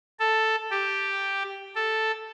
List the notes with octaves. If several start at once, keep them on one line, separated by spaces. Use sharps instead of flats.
A4
G4
A4